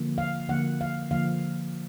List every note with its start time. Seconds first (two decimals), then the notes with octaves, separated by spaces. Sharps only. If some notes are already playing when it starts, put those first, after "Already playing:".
Already playing: D3 F3 A#3
0.18 F5
0.49 D3 F3 A#3 F#5
0.81 F5
1.11 D3 F3 A#3 F5